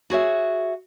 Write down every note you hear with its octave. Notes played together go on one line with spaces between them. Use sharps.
F#4 G#4 C#5 E5